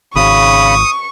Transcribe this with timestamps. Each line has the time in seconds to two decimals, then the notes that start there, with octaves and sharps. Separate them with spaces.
0.16 G#1 C#3 B5 C#6 D#6